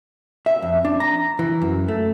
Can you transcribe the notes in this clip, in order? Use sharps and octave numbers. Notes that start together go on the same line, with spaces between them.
E5
F2
D4
A#5
E3
F#2
A3